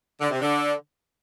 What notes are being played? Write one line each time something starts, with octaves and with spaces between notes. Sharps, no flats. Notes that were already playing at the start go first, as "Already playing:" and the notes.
D3
C3
D3